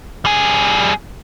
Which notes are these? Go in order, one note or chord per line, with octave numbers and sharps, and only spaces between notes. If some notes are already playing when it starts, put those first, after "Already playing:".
G3 G#4